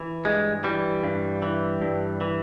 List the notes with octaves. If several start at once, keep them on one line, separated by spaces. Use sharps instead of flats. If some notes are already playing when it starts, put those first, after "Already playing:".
Already playing: E3
G2 G#3
E3 G3
G2
E3
G2
E3